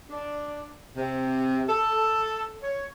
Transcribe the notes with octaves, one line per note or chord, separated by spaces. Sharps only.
D4
C3
A4
C#5